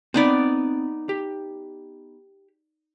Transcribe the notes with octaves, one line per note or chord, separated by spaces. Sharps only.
B3 C4 D#4 D5 B5
G4